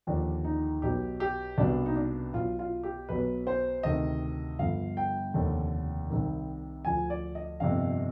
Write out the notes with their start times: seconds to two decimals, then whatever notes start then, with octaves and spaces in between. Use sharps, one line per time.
0.07 D#2 D3 F3 D4
0.45 D#4
0.82 B1 B2 G4
1.20 G4
1.58 C2 B2 D4
1.86 D#4
1.96 D4
2.33 B1 B2 F4
2.59 F4
2.83 G4
3.09 B1 B2 B4
3.47 C5
3.83 D2 C3 D#3 D#5
4.59 G1 G2 D3 F3 F5
4.97 G5
5.34 F1 D#2 D3
6.10 C2 C3 D#3
6.85 D2 D3 F3 G#5
7.10 D5
7.35 D#5
7.60 G1 F2 C3 F5